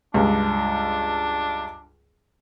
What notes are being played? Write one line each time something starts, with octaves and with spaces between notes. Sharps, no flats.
C#2 G2 D4